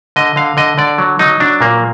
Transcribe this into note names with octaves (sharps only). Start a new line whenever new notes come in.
D3 D#5
D3 F5
D3 D#5
D3 D5
F#3
F#3 D#4
F#3 D4
A#2 A#3